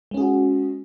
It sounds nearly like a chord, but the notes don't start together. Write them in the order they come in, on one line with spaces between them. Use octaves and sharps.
G#3 C#4 G#4 F#4